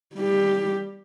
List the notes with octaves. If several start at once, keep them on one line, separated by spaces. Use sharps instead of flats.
G3 G4